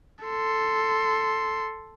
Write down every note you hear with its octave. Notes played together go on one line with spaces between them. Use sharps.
A4 C6